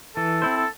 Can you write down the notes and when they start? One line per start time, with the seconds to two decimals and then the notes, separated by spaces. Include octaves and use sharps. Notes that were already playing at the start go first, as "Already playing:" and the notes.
0.16 E3 A4
0.42 C4 E4 C5
0.56 A4